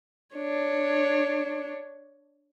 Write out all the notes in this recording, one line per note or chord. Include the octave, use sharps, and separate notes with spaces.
D4 C#5